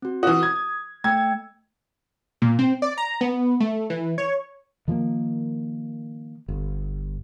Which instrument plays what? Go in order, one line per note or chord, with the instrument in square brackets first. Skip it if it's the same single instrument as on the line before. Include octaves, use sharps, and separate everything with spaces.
[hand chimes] C4 F#4
[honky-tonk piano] E3 F#4 [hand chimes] D#6
[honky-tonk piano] G#6
[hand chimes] A3 G5 E6 [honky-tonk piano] G#6
[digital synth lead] A#2
C4
D5
A#5
B3
A3
E3
C#5
[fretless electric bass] D#3 F3 G#3 A#3
G1